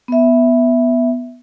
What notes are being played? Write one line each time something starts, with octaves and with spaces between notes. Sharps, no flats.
B3 E5